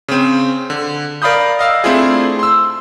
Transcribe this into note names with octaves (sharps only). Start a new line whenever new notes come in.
C#3 C4
D3
A#4 D5 F5 B5 D#6 G6
D#5 F5 E6
A3 C4 D4 E4 F4 G#4
C6 E6